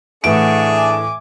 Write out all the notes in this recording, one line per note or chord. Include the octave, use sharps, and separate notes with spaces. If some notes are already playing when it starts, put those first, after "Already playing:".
A2 E3 D4 G#4 E5 F#5 C#6 D7
G#5 D6